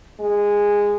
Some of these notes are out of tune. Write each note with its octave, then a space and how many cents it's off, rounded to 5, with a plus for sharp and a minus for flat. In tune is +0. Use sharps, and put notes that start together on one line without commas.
G#3 -15